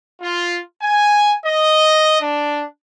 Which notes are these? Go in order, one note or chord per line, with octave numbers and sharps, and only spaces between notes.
F4
G#5
D#5
D4